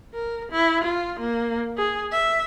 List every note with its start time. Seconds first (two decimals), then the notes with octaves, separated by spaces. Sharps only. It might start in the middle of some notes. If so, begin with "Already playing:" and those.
0.14 A#4
0.52 E4
0.84 F4
1.19 A#3
1.77 G#4
2.12 E5